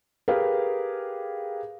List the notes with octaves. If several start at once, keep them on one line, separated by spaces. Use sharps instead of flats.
G4 G#4 A#4 B4 F5